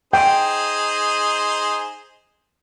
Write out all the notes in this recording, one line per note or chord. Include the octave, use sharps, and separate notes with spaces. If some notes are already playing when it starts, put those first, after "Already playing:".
D#4 G#4 C5 G5